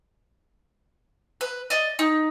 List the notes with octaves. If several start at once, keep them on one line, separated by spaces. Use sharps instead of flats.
B4
D5 D#5
D#4